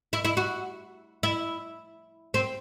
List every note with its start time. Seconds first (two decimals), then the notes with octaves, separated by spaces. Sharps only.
0.13 E4
0.25 E4
0.37 F#4
1.23 E4
2.34 C4